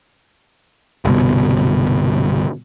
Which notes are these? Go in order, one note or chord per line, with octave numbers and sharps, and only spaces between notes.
G1 C2 B2